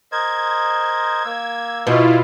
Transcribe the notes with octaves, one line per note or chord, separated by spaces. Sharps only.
A#4 C5 D#5 G#6
A#3 E6
B2 E4 F4